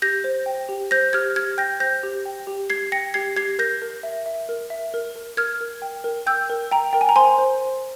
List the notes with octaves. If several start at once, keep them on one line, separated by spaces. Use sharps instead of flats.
G4 G6 A#6
C5
G5
G4
C5 G6 A#6
G4 F6 G#6
G4 F6 G#6
G5 G6 A#6
C5 G6 A#6
G4
G5
G4
G4 G#6 C7
G5 A#6 C#7
G4 G#6 C7
G4 G#6 C7
A#4 G6 A#6
A#4
E5
E5
A#4
E5
A#4
A#4
A#4 F6 G#6
A#4
G5
A#4
G5 E6 G6
A#4
G5 A#5
A#4 G5
G#5
A#5
C5 G#5 C6
C5
C5